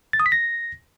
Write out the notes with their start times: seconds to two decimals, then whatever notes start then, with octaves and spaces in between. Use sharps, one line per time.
0.13 A6
0.20 D#6
0.26 B6
0.32 A#6